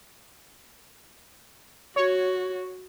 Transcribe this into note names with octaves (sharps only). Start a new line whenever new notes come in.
F#4 C#5